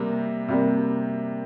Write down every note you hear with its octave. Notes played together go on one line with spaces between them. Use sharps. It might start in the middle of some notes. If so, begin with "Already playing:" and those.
Already playing: C3 G3 A#3
C3 G3 A#3